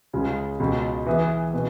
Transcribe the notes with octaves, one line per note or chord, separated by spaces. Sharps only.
C#2 C#3 G#3
C#2 B2 G#3
E3 B3 G#4
B2 B3